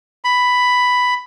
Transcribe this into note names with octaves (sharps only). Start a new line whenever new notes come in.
B5